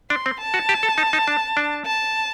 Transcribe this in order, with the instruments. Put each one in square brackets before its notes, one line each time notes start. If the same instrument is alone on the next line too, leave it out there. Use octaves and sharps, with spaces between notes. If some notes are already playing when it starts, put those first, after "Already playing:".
[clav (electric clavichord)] D4 [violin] C6
[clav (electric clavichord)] C4
[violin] A5
[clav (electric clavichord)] F#4
G4
A4
D#4
D#4
D4
D4
[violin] A5